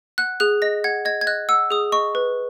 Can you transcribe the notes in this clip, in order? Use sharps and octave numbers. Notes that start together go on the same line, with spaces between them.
F#5 F#6
G#4 F#6
D#5 A#6
F#5 G#6
D#5 G#6
G#6
D#5 F#6
F#5 E6
G#4 D#6
D#5 C#6
B4